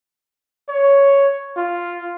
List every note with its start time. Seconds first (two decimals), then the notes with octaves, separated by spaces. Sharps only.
0.69 C#5
1.57 F4